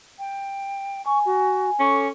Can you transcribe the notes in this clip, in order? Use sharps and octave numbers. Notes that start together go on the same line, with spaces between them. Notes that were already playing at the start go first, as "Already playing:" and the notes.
G5
G#5 C#6
F#4
C#4 A4 C#6 D6